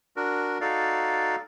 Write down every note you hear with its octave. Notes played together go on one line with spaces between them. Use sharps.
D4 F#4 A#4
D#4 F#4 A4 D5 F5